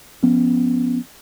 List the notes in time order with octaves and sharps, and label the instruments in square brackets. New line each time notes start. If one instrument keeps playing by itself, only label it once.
[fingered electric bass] F3 B3 C#4